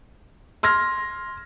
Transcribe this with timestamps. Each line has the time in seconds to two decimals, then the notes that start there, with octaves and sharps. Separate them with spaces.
0.63 C6 F6 G#6 A#6